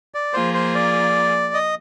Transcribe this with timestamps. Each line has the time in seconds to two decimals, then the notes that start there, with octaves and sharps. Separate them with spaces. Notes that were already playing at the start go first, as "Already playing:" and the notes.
0.14 D5
0.33 F3 A#3 F4 G#4 C5
0.54 C5
0.74 D5
1.54 D#5